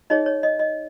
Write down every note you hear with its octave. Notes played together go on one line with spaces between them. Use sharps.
D#4 G#4 C#5 D#5
C#5
D#5
D#5